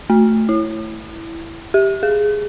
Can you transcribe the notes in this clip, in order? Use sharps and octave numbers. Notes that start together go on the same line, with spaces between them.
A3
E4
G4
G#4